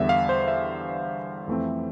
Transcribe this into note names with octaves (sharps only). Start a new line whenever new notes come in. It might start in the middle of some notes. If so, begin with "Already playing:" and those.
Already playing: E2 D3 G3 B3 E5
F5
C5
E5
F2 E3 A3 C4